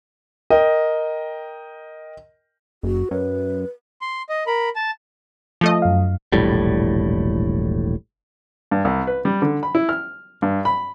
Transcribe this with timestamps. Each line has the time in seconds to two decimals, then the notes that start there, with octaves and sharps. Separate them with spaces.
0.50 A#4 D#5 G5
2.83 F#1 F#4
3.11 F#2 B4
4.01 C6
4.29 D#5
4.47 A#4 B5
4.76 A5
5.61 F3 A3 D#5
5.82 F#2 F5
6.32 E1 A#1 A2 G3
8.71 G2
8.85 C2
9.07 B4
9.25 G3
9.42 D3
9.63 B5
9.75 E4
9.89 F6
10.42 G2
10.65 B5